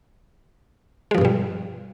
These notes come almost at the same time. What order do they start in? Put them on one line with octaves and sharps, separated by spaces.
G#3 F3 G2 B2 G3